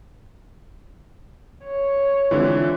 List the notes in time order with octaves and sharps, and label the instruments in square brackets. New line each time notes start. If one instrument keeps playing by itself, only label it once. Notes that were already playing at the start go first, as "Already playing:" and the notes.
[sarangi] C#5
[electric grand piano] D3 E3 [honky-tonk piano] G#3 C4 E4 [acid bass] F4